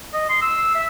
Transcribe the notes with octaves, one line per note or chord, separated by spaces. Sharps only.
D#5
C6
E6
E5